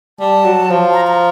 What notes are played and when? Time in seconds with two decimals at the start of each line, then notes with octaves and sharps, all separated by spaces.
0.20 G3 A5
0.44 F#3
0.70 F3
0.94 A#5
1.08 A#5